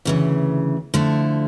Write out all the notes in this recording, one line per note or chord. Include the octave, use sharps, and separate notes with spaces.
D2 C#3 E3
D3 F3 A3 E4